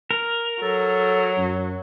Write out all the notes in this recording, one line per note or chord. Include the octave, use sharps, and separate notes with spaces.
A#4
F#3 A4
F#2